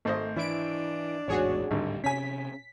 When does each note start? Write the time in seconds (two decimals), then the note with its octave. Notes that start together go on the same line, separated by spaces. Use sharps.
0.05 G#1 A3 C5 D#5
0.36 E3 D4 E4 D7
1.28 A1 E2 G#2 F#4 G#4 C#5
1.71 G#1 D2 A2 D3 G3
2.04 C3 C#4 C#5 G#5 B6